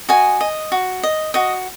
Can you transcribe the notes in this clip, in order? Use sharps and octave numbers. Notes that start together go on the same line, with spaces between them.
F#4 D#5 G#5
D#5
F#4
D#5
F#4 D#5